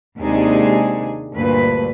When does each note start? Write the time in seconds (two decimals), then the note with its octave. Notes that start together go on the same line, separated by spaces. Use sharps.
0.19 D#2 C3 G#3 D4 D#4 G#4
1.34 D2 G2 A#2 B4